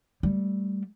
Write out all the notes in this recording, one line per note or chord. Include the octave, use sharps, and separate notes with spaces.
G3 A3